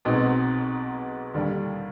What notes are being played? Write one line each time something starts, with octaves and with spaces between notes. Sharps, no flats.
B1 B2 G#3 C4 D#4
D#2 D3 G3